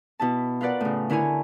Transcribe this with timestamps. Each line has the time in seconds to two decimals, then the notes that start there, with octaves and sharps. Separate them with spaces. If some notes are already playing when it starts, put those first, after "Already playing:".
0.20 B2 E4 A5
0.61 F4 A#4 B4 D5 F#5
0.81 A2 C#3
1.10 D3 E4 A#4 C#5 G#5